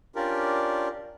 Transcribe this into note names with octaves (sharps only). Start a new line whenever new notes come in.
C#4 D4 F4 G4 A#4 D5